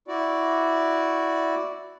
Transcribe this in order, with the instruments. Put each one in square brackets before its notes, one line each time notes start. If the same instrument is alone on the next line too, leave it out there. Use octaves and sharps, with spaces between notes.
[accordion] E4 F#4 D5